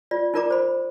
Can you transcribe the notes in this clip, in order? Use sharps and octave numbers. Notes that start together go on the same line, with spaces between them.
F4 D5
D#4 F4 A#4 D5 A#5 D6
C5 B5